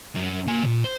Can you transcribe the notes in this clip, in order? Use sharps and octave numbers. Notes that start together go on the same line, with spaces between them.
F#2
A#3 G#5
C#2 A#2
C5